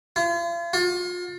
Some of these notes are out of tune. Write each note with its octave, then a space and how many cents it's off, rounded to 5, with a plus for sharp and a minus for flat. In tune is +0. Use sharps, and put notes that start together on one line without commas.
F4 -40
F4 +35